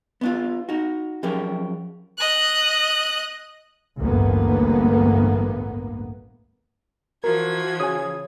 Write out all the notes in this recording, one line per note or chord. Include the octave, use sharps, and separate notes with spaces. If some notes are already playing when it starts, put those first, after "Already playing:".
B3 D4 F4
D#4 F#4
F3 F#3 C#4 G4 G#4 A#4
D#5 F#6
A1 D2 G2 A#3 B3
E3 F3 F#4 A#4 G#6
C#3 G#5 D#6